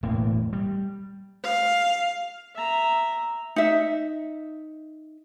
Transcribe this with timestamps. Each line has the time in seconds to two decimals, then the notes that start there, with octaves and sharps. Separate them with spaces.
0.03 E1 A2 A#3
0.53 G3
1.43 F5
2.55 E5 A#5
3.56 D#4 E5